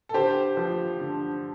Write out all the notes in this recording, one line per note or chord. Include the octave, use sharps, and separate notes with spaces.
A4
D3 G4 C5
F3
D3